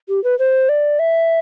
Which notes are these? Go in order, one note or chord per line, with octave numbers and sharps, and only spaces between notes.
G4
B4
C5
D5
E5